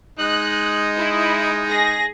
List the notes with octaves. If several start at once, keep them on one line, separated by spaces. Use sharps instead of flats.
G#3 D#4 F#6
E4
G#4 A#6